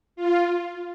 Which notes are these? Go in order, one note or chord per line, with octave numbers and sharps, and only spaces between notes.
F4